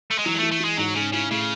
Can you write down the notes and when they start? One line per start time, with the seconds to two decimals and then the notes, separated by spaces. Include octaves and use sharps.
0.11 A3
0.18 G#3
0.25 E3 F#3
0.35 G#3
0.39 A3
0.43 E3
0.52 A3
0.60 E3 G#3
0.77 G#2 F#3
0.95 G#2 C#3
1.13 C#3 E4
1.31 A2 C#3